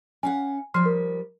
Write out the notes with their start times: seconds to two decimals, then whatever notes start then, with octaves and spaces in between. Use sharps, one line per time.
0.23 C#4 F5 F#5 G#5
0.74 F3 G3 C6 F6 C7
0.86 A#4